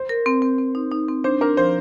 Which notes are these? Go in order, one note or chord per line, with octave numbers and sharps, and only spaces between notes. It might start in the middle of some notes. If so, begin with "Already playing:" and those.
Already playing: C5
A#4
C4
C4
C4
D#4
D#4
C4
D4 C5
D4 A#4
F3 C5